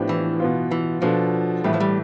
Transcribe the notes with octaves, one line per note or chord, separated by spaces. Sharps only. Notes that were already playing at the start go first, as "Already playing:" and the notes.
Already playing: A2 F3 B3 D4 G4
E3
B2 B3 F4
E3
B2 F3 B3 D4 F4 A4
A2 E3 G3 A3 E4
F3
G3